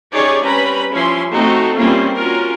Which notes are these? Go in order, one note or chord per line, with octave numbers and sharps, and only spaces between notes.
C#4 D#4 G4 G#4 C#5 D5
G3 C4 C#4 B4 A#5 B5
F3 C#4 E4 C6
A3 C4 D#4 F#4 A4
G3 A#3 C4 C#4 E4 F4
C#4 F4 F#4 A#4